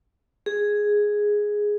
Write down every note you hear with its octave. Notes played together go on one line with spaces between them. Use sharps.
G#4